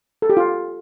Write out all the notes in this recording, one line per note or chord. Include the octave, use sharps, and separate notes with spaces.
A4
G4
F4